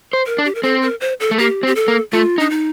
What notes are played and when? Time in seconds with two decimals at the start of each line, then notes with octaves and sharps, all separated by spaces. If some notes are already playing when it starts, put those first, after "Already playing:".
0.13 C5
0.26 A#4
0.38 D4
0.45 G4
0.55 A#4
0.63 C4 A4
0.82 A#4
1.00 C5
1.20 A4
1.31 A3
1.38 A#3 G4
1.63 C4
1.67 G4
1.75 A4
1.88 A#3
2.12 A3 F4
2.38 D4 D#4
2.50 D#4